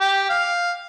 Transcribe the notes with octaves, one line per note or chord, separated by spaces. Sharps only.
G4
F5